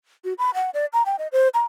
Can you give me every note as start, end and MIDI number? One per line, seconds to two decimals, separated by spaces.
0.24 0.33 66
0.38 0.50 83
0.54 0.70 78
0.74 0.86 74
0.93 1.03 82
1.06 1.16 79
1.19 1.28 75
1.32 1.48 72
1.54 1.64 82